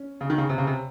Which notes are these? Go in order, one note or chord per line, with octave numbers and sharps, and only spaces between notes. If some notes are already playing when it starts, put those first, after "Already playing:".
Already playing: C#4
C#3
D#3
C#3
C3
C#3
C3